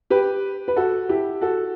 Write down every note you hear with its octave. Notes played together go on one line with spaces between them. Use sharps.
G4 B4
B4
F#4 A4
E4 G4
F#4 A4